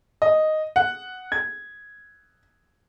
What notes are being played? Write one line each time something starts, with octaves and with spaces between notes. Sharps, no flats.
D#5
F#5
G#6